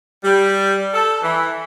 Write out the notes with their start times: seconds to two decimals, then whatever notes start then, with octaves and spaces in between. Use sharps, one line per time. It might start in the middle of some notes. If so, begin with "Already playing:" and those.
0.24 G3
0.94 A4
1.22 E3